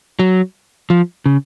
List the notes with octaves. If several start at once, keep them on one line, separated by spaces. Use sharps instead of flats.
F#3
F3
C#3